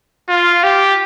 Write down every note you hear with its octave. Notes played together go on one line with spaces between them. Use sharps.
F4
G4